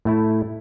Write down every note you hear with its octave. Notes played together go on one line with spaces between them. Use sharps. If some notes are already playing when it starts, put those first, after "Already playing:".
A2 A3 E4